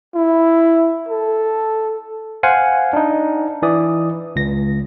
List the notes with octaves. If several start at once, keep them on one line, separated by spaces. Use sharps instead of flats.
E4
A4
C5 F5 F#5 G#5
D4 D#4
E3 D5 D#6
C#2 A#6